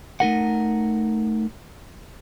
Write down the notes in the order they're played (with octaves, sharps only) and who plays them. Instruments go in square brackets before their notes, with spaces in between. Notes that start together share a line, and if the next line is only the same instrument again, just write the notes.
[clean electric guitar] A3 D#4 A#4 F#5